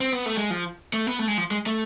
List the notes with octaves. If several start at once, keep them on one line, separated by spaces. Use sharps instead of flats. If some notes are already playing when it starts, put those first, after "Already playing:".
C4
B3
A3
G#3
F3
A3
B3
A3
G#3
F3
G#3
A3